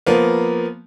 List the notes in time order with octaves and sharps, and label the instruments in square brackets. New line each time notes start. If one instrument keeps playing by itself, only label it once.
[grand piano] F3 A#3 B3